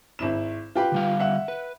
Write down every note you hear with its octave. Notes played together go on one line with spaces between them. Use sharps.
G#1 E4 E7
F4 G4 B4
D3 G3 F5
E5 F#5
B4